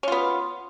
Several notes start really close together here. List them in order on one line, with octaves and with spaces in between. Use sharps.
C#4 F4 B3